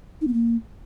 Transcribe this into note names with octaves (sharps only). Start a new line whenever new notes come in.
D#4
B3
A#3